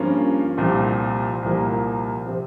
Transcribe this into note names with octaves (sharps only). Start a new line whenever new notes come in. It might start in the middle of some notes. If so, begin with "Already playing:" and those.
Already playing: G2 F3 A#3 C#4 F4
C2 A#2 F3 C4
C2 A#2 F3 A#3
C3 F3 C4